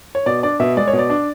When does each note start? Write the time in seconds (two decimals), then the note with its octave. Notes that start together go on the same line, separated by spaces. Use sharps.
0.15 C#5
0.26 B2 D5
0.43 D4 D5
0.60 B2 E5
0.77 G#3 D5
0.88 C#5
0.93 B2
0.99 D5
1.10 D4